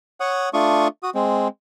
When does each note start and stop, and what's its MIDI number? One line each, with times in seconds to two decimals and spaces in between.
0.20 0.49 73
0.20 0.49 78
0.20 0.49 87
0.54 0.88 57
0.54 0.88 62
0.54 0.88 65
0.54 0.88 85
0.54 0.88 87
1.03 1.10 66
1.03 1.10 87
1.15 1.48 56
1.15 1.48 60